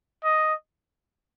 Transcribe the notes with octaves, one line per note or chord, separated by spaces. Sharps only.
D#5